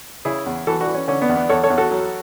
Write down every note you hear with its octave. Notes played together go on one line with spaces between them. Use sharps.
C#3 E4 G#4
E2
E3 F#4 A4
D4 F#4
E3
C#4
D3 C#4
B3 D4
E2
B3 D4
E2 A4 C#5
A4 C#5
E2
F#4 A4
F#3